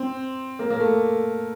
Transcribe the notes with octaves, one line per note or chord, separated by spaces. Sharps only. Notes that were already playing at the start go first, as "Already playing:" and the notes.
Already playing: C4
A#3
A#3
A3